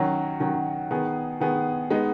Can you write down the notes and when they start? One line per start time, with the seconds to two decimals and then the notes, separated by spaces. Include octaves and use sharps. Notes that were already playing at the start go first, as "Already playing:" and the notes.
Already playing: D#3 F#3 C#4 F#4
0.40 D#3 F#3 C#4 F#4
0.91 D#3 B3 G#4
1.40 D#3 B3 G#4
1.90 G#3 B3 D#4